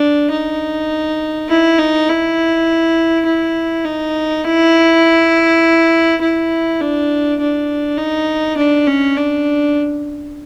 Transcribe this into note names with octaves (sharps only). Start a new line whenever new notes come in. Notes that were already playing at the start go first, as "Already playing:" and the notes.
Already playing: D4
D#4
E4
D#4
E4
E4
D#4
E4
E4
D4
D4
D#4
D4
C#4
D4